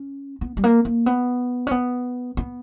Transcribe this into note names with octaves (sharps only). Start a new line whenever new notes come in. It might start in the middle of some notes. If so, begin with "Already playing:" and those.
Already playing: C#4
B3
G3
A#3
A#3
B3
C#4
B3
B3